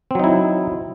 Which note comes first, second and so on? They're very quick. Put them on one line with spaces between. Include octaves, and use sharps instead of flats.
C4 F#3 D#4 E4